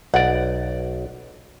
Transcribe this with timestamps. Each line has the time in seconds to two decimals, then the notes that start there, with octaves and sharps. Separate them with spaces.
0.14 B1 D5 F#5